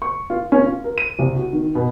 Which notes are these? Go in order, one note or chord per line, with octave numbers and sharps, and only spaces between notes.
C#6
F4
C#4
F4
A#4
D#7
C2
F#4
D#3
B2